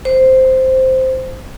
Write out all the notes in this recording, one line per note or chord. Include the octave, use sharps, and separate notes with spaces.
C5